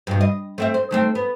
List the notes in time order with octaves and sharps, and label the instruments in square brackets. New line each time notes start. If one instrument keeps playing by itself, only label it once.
[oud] G2 B2
D#5
A3 C4 E5
C5
D#3 A3 C4
B3